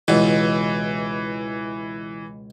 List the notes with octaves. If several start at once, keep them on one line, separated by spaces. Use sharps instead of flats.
C#2 B2 E3